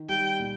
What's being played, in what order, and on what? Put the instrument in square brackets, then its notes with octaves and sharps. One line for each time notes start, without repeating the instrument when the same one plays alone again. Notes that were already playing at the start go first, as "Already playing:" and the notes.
Already playing: [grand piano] D#3
[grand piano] G3 [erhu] G5
[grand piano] A#2